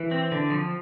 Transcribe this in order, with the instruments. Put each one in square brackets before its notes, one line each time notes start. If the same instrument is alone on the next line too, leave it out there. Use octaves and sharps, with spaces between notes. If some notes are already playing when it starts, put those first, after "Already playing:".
Already playing: [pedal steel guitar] E3
C4
D3
F3